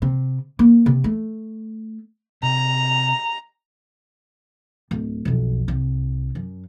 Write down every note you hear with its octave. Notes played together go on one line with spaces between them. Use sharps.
C3
A#3
C3
A3
C3 A#5
D1
B1 F2
C2
F#2